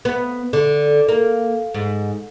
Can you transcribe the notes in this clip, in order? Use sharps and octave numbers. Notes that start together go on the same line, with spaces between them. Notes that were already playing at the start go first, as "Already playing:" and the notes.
B3
D3
A#3
G#2